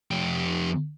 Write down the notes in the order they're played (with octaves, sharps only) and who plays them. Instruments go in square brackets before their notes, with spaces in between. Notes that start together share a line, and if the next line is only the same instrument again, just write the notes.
[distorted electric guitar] F2 G4